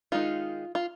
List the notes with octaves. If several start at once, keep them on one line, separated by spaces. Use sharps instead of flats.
D#3 G#3 D#4 F4
F4